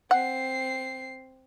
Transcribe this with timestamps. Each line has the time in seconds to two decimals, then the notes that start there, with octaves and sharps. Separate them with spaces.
0.11 C4 F#5 C7